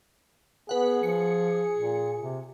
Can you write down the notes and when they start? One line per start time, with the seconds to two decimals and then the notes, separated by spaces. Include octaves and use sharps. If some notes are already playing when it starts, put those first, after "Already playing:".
0.69 B3 G#4 B4 F#5
1.03 F3 C#7
1.75 A#2
2.21 C3